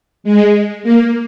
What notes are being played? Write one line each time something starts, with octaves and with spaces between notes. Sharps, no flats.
G#3
A#3